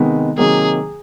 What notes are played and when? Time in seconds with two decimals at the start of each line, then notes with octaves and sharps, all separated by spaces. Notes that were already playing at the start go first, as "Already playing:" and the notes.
Already playing: C3 D#3 G#3 B3 D#4
0.38 C3 D#3 F#3 A#3 G#4